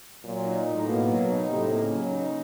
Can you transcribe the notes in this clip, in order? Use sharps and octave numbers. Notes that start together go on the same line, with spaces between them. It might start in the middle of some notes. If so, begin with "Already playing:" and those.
A#2 F#3
D#4
A2
B2 A#3
F#3
D#4
A2 C3
A#3
C#3
F#3
D#4